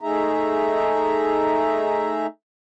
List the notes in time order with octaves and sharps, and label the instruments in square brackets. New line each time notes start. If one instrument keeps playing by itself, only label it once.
[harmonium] A3 D#4 G#4 E5 A#5